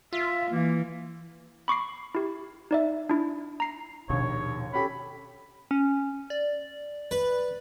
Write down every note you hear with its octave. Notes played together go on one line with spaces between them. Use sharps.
F4 E5
E3 A#3
B5 C#6 D6 C7
E4 G4
D#4 D5 E5
D4 E4
A#5 C7
A#1 D#2 B2 C#5
C#4 G4 A4 B5
C#4
D5
B4